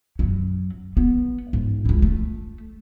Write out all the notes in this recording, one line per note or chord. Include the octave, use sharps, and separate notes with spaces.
F#2 F#3
B3
G#2
C#2 E4
A3